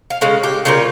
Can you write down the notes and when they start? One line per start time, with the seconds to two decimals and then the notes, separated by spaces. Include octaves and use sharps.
0.10 F5
0.21 C#3 G#3 C#4 F5
0.43 G4
0.65 C#3 G3 A#3 F4